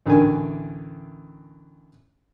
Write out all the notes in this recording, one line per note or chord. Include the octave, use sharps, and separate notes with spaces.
A1 D2 D3 D#3 G#5